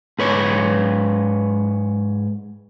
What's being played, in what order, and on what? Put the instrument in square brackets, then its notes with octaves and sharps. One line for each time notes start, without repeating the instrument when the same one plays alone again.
[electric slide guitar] G#2 B4 C#5